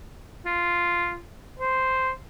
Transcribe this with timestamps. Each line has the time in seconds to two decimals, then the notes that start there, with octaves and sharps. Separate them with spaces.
0.46 F4
1.59 C5